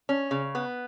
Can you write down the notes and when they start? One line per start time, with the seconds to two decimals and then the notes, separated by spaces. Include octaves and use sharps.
0.09 C#4
0.31 C#3
0.55 B3